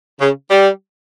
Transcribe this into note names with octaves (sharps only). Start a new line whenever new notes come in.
C#3
G3